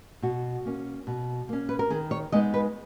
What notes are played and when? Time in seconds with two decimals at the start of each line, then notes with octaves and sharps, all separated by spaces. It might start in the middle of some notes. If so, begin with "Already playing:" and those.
0.22 B2 F#4
0.65 A#3 C#4
1.07 B2
1.49 A#3 C#4
1.69 B4
1.79 A#4
1.90 D#3 G#4
2.11 C#5
2.32 G#3 B3 D#4 D#5
2.54 B4